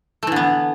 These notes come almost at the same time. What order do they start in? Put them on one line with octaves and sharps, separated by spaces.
A3 E3 D3 B3